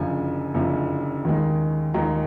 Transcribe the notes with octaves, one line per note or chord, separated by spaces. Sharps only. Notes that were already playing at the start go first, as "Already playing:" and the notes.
Already playing: F#1 F#2 D3 F3 G#5
F#1 F#2 D3 F3
D#2 D#3 G#3
D#2 D#3 G#3 A#5